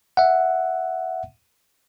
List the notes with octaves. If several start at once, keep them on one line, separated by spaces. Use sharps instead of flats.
E5 F#5